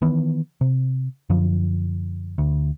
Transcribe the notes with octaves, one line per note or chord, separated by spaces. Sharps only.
D#3 E3 B3
C3
F#2 D3 F3
D2